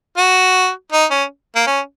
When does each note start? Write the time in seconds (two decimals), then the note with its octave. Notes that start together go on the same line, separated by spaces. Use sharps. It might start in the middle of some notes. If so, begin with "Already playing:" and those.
0.17 F#4
0.92 D#4
1.11 C#4
1.56 A#3
1.67 C#4